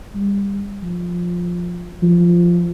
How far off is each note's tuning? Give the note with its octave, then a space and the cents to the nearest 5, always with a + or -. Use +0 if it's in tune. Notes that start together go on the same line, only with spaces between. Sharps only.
G3 +25
F3 +10
F3 -5